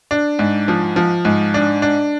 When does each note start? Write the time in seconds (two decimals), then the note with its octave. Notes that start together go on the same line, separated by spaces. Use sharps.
0.11 D4
0.39 G#2
0.68 F3
0.96 F3
1.25 G#2
1.54 D4
1.82 D4